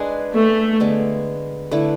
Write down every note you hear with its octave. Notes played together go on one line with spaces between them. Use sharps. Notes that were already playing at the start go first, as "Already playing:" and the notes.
Already playing: G#3 D4 G#4 B4
A3
D3 G#3 B3
D3 A3 E4 B4